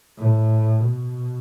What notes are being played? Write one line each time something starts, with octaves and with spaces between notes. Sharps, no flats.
A2
B2